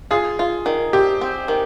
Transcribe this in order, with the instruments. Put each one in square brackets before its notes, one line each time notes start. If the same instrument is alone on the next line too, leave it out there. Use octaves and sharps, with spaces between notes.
[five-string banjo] F4 [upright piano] G#4
[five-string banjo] F4
D#3
[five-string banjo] C4 [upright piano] G4
[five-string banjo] C4
D#3